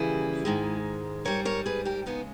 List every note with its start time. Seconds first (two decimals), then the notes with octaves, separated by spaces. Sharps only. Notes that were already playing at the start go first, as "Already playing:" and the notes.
Already playing: D#2 C#3 E3 G3 E4 G#4
0.45 G#2 D#3 G#3
1.25 G#2 G3 A#4 C#5
1.45 A#4 C#5
1.66 G#4 B4
1.85 G4 A#4
2.06 D#2 C#3 G#3 B3 D#4